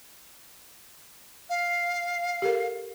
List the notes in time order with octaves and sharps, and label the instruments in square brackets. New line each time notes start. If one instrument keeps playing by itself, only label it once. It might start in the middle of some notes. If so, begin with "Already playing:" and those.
[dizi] F5
[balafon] G4 A4 A#4